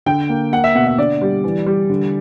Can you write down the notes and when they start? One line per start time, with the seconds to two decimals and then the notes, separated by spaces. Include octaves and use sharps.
0.06 D3 G5
0.29 A#3
0.52 A#3 F#5
0.64 E5
0.75 B2 F#5
0.87 E5
0.98 D3 D5
1.21 G3
1.44 E3
1.66 G3
1.90 D3